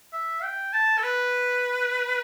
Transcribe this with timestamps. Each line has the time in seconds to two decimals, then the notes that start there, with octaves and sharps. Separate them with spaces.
0.13 E5
0.43 G5
0.73 A5
0.98 A4
1.03 B4